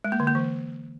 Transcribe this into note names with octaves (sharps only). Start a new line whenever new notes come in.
G#3
A#3
D3
A#3
E3